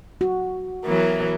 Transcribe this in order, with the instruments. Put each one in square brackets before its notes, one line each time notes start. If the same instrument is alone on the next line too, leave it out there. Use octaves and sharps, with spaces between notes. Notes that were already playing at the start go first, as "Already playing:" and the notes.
[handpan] F#4
[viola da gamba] E3 F#3 B3 [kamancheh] A#4